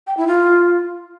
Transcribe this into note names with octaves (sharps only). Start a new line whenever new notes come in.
G5
E4
F4